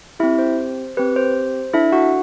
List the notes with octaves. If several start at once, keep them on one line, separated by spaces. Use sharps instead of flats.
C4 E4 G4 E5
C5
C4 G4 B4
C5
D4 E4 A4 E5
F#4 F#5